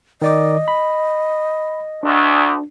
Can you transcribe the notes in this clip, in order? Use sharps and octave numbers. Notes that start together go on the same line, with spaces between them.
D#3 D5 D#5 D6
B5
D2 D4